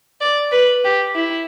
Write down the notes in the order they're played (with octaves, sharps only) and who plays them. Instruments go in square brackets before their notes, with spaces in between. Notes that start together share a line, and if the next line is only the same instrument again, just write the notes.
[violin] D5
B4
G4
E4